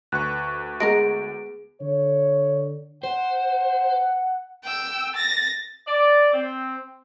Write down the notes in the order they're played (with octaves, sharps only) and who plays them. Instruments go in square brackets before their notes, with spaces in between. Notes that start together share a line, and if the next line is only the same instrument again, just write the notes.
[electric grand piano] D2 B4 C#6 [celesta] F#6
[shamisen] G#3 B3 A#4 [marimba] G#4 A#6 [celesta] D7
[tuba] D3 [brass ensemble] C#5
[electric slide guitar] C5 [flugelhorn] F#5
[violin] G5 E6
A6 A#6
[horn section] D5
C4